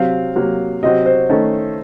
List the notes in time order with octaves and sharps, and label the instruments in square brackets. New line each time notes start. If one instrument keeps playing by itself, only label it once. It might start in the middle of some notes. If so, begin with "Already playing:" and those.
Already playing: [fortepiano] C3 F#3 C4 [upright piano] F5
[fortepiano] C3 F#3 A#3
[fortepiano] C3 F#3 C4 F#4 [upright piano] D#5
[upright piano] C5
[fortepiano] D#3 A3 C#4 A4